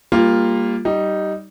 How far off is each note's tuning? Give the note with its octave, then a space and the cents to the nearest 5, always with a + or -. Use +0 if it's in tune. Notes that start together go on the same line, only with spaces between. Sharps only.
G3 +20 A#3 +0 F4 +0
G3 -15 D#4 +0